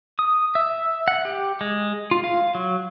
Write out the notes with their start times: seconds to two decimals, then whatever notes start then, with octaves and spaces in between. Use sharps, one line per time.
0.19 D#6
0.55 E5
1.08 F#5
1.25 G4
1.61 G#3
2.11 F4
2.24 F5
2.55 F#3